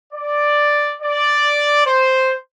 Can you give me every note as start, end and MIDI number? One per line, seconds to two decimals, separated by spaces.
0.13 0.95 74
1.02 1.83 74
1.86 2.34 72